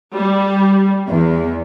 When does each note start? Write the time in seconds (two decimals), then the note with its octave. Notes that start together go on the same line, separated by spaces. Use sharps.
0.13 G3
1.08 E2